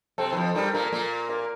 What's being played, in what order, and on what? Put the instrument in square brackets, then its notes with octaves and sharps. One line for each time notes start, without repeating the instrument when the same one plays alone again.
[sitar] C3 C4 [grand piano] A4
[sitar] E3
[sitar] F2 F3 [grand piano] A4
[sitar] G2 G3 [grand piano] A#4
[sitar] A#2 A#3 [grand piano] A#4
[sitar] A#2 A#3
[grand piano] A#4